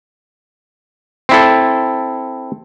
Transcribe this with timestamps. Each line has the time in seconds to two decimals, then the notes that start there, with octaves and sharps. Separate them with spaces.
1.29 C4 E4 A4